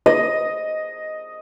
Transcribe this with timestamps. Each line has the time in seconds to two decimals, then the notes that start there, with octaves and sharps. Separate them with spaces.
0.06 D#5